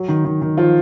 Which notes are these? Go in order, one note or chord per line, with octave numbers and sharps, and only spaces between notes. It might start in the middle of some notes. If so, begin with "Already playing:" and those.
Already playing: F#3
D#3
D#3
D#3
F3 F4